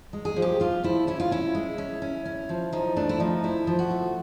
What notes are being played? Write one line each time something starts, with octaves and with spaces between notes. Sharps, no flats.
G#3
G#4
F3
G4
F3 F4
F3 E4
C#4 E4
F4
C#4 E4
G#3
C#4
C#4
C#4
F3
F3 D#4
A3 D4
E4
F3 D#4
F3 E4
F3
F#4
A3